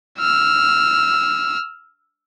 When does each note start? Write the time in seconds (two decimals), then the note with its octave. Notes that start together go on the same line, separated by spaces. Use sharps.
0.19 E6 F6